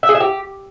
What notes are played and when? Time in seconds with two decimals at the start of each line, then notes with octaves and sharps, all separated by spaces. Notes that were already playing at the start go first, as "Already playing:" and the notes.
0.03 E5
0.09 G#4
0.15 E5
0.20 G4